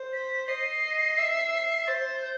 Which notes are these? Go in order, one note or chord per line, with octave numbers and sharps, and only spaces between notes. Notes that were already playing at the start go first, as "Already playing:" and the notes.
Already playing: C5
B6
D#5 C7
D#5
E5
C5 A6
G6